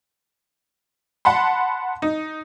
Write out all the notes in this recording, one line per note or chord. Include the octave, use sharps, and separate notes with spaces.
F#5 A5 B5 C6
D#4